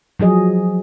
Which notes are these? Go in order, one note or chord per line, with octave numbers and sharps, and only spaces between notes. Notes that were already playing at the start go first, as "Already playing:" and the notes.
F3 F#3 G#4 D#5